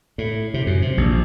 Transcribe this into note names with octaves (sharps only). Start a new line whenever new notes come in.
A2
C3
F#2
C3
A#1